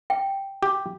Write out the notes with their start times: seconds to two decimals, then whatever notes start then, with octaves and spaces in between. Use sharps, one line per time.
0.10 G5
0.63 G4